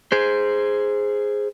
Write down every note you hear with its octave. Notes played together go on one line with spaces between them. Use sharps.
G#4 C5